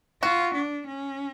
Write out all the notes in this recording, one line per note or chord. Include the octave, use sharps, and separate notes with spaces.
F4 F#4
D4
C#4